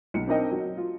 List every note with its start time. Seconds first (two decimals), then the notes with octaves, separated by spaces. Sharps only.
0.14 B1 C#7
0.27 C4 D4 D#4 A#4 D#5 G5
0.51 F#3
0.77 F4